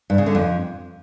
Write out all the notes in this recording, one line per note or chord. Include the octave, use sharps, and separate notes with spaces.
G2
C#3
D3
F2